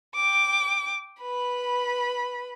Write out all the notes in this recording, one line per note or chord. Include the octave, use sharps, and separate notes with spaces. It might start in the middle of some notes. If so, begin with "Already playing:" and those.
G5 D6
B4 B5